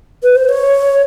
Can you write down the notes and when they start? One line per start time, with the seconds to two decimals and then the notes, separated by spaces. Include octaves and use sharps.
0.23 B4
0.35 C5
0.49 C#5